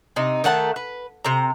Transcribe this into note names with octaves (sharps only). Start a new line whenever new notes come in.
C3 D#4
D#3 A3 F#5 A5
B4
C3 A#5